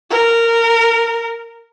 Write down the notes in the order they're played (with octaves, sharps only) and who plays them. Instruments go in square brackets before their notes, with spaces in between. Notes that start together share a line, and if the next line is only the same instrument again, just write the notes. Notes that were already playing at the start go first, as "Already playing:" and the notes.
[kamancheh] A#4